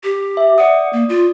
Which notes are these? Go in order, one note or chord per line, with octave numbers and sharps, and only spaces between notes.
G4
E5
D5 F#5 D#6
A#3
F4